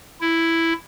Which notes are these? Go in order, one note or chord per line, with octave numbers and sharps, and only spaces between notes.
E4